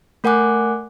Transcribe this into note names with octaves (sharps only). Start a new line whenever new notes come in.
A3 A#4 F#5 G#5 D6 F#6